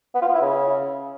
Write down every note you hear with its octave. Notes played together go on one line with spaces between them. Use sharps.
B3
F4
B3
E4
C#3